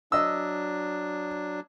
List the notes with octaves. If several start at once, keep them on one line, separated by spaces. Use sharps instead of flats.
F#3 D4 D#5 E6